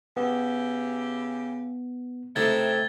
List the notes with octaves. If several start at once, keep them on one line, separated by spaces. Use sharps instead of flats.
C#3 B3 E4 G4
C3 A3 C4 D#4 E4 G#6 A6 G7